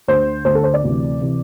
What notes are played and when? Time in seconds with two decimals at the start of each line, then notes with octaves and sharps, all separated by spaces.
0.08 D2 D3 C5
0.45 D2 D3 C5
0.55 A4
0.64 C5
0.74 D5
0.84 D2 C3 E3
1.21 C3 E3